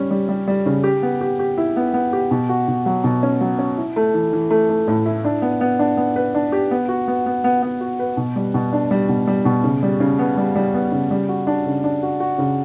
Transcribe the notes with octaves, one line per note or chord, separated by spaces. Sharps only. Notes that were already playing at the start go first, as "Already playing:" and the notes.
Already playing: G3 C#4
G3
G3
G3
C#3
G4
B3
G4
G4
E4
B3
B3
G4
B2
F#4
B2
F#3
B2
C#4
F#3
C#4
E4
A3
E3
E3
A3
A3
A2
E4
D4
B3
B3
D4
B3
B4
D4
G4
B3
F#4
B3
B3
B3
B3
F#4
B4
B2
G3
B2
D4
G3
B2
G3
B2
C#3
G3
C#3
B3
G3
G3
B3
C#3
G3
F#4
D4
C#3
D4
F#4
F#4
C#3